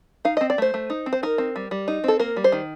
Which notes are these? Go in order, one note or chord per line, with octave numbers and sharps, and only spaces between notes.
D#4 F5
D#5
C4
D5
A3 C5
A3
D#4
C4
C5
D#4 A#4
C4
G3
G3
D#4
C4 A4
A#3 A#4
G3
C5
D#3